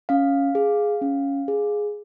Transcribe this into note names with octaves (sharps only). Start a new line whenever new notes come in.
C#4 F5
G#4
C#4
G#4